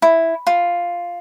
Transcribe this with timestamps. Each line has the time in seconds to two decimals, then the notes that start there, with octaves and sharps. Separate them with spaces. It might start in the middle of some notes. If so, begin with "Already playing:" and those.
0.02 E4
0.47 F4